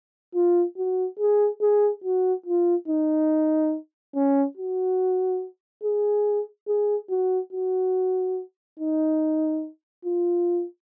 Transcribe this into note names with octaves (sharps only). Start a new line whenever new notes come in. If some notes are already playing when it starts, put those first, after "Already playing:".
F4
F#4
G#4
G#4
F#4
F4
D#4
C#4
F#4
G#4
G#4
F#4
F#4
D#4
F4